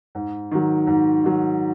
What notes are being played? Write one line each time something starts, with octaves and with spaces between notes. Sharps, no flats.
G#2
D#3 F#3
G#2
D#3 F#3